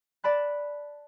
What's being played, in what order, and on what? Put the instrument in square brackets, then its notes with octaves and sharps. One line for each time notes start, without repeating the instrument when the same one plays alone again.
[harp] D5 A5 B5 F#6